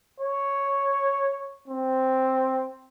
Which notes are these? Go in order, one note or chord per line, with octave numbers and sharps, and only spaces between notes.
C#5
C4